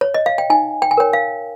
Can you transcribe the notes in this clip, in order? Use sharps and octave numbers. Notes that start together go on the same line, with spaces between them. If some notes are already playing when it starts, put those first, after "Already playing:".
C#5
D#5
F5
G5
D#4 G#5
G5
G#5
A#4 C#5 G5
F5